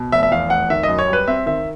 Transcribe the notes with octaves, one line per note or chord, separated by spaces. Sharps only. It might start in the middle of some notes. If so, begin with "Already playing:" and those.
Already playing: B2
F1 E5
E5
E2 F5
F1 F#5
D#3 E5
F#2 D#5
C#5
G3
B4
C4 E5
D#3 E5